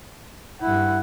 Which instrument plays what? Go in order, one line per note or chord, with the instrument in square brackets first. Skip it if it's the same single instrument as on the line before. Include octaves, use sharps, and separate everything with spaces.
[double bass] G2 E4 [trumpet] F#5